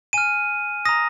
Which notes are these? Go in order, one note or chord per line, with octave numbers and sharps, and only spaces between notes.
G#5 F6 D#7
A#5 D#6 A#6